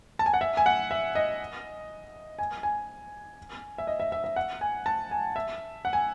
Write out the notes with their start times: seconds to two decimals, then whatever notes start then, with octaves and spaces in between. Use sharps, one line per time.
0.19 A5
0.26 G#5
0.34 F#5
0.41 E5
0.57 G#5
0.66 F#5
0.91 E5
1.15 D#5
2.39 G#5
2.63 G#5
3.78 E5
3.87 D#5
4.00 E5
4.12 E5
4.24 E5
4.36 F#5
4.61 G#5
4.86 A5
5.11 G#5
5.36 E5
5.85 F#5
5.93 G#5